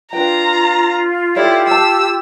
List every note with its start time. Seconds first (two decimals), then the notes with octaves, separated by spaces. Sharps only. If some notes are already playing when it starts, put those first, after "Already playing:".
0.13 D4 F4 B4 G5 A#5
1.36 E4 G4 A4 C#5 D5
1.67 F5 A5 E6